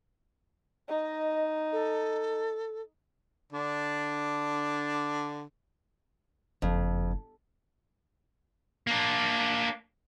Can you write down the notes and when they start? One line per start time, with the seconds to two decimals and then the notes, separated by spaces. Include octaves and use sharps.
0.89 D#4 D#5
1.72 A4
3.53 D3 D4
6.62 F#1 F2
8.87 A#3 D4